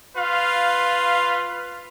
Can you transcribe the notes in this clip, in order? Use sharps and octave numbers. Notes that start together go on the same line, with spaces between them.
F4 B4 F5